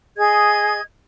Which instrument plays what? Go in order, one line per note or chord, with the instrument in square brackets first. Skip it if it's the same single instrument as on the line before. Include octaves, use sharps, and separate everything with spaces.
[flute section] G#4 D#5 G#6